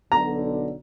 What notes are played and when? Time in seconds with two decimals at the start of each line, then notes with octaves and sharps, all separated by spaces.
0.12 B1 D3 A#5